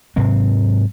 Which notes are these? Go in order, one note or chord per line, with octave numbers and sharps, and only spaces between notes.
G#2 C3 F#3 C4